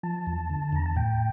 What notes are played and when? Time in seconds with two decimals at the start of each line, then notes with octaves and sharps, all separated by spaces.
0.03 F3 A5
0.27 E2
0.50 D3
0.72 E2 A#5
0.86 A5
0.96 A2 G5